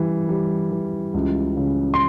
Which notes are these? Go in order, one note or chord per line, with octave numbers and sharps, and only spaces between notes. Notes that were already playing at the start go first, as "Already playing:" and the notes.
Already playing: E3 G3
G3
E3
C#2
C#3
C6